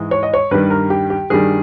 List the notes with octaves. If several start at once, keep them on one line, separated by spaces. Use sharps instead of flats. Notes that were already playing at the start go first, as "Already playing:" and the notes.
Already playing: G#2 E3 G#3
C#5
D#5
C#5
G2 D#3 G3 B4
A#4
G4
G4
G2 D#3 G3 G#4